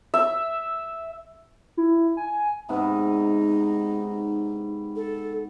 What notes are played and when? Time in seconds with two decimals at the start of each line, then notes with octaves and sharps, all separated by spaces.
0.14 E5
1.77 E4
2.17 G#5
2.69 G#2 C3 B3 D#4
4.96 A4